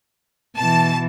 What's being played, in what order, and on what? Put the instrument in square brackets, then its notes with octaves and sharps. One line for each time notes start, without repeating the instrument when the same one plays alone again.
[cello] B2 E3 [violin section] A5